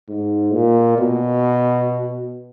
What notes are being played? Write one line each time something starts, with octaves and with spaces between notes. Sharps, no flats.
G#2
A#2
B2